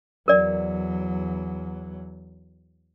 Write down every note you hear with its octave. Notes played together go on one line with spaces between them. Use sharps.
E2 F#3 A#4 D5